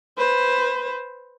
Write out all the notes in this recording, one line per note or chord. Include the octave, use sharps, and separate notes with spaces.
B4 C5